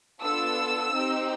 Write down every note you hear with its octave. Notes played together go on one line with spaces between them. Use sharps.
B3 D4 F4 A4 E6
C4 D#4 G4